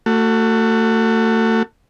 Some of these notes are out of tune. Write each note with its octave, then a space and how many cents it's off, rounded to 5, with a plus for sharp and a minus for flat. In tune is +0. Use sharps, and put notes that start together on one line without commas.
A3 +30 F#4 +0